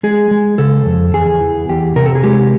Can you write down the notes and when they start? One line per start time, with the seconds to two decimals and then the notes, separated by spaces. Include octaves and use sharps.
0.03 G#3 G#4
0.31 G#3
0.58 C#3 A4
0.86 F2
1.14 E2 G#4
1.40 E3
1.69 E2 G4
1.96 C3 A#4
2.06 A4
2.15 G#4
2.24 G#3 G4